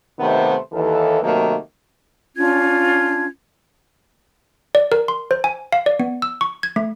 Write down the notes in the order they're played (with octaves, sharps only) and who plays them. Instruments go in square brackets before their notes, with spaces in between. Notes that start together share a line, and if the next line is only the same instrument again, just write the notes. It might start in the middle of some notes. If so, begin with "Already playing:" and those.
[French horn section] D#2 C3 D#3 A3 B3 C5
D#2 E3 A4
C3 D#3 F#3 A3 A#3
[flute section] C#4 D4 F4 G#6
[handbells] D5
A#4
C6
C5
G#5
F5
D5
B3
E6
C#6
G#6
A3